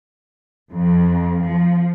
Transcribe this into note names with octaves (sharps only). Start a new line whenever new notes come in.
F2
F3